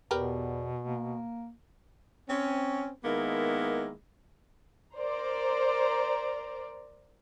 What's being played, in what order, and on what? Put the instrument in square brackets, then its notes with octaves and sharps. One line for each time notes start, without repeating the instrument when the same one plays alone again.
[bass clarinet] E2 [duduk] B2 [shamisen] G4 A#4 B4
[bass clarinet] A#3
[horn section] C4 C#4
D#3 G#3 A#3 B3 E4
[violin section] A#4 C5 D5 A#5